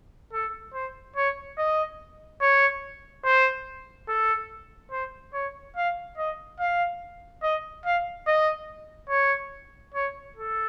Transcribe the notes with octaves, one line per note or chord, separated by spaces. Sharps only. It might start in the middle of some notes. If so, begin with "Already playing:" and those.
A4
C5
C#5
D#5
C#5
C5
A4
C5
C#5
F5
D#5
F5
D#5
F5
D#5
C#5
C#5
A4